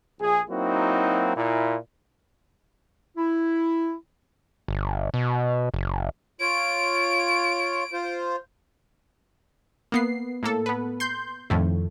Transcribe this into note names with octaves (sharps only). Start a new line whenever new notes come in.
A#1 G#4
F#3 A#3 C4 D#4 E4 F#4
A#2 E4
E4
G1
B2
F#1
F4 C#5 D7
F4 C5
A#3 B3 C7
A2 A#3 A4
B3 B4
C6 G6
F2 A2 D#3 A3